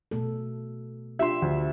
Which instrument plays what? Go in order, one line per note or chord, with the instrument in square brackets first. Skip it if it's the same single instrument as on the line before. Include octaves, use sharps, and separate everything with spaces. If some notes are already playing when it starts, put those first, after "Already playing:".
[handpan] B2 A3 A4
[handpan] D4 F4 G4 [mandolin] E5 C6
[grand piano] D2